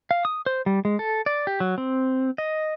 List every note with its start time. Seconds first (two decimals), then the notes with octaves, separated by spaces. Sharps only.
0.11 F5
0.25 D#6
0.46 C5
0.66 G3
0.85 G#3
0.99 A4
1.26 D5
1.47 G4
1.60 F#3
1.78 C4
2.38 D#5